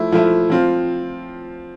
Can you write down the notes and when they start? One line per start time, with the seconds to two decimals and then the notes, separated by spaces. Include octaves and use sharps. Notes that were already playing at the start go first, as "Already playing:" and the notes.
Already playing: F3 A3 E4
0.12 F3 A3 E4
0.50 F3 C4 F4